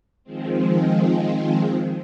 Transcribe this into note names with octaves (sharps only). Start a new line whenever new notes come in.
D#3 F3 G#3 C4